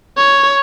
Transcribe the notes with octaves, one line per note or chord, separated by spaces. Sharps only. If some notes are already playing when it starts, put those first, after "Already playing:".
C#5